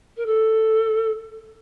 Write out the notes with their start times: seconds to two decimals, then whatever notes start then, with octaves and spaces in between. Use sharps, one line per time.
0.16 A#4
0.26 A4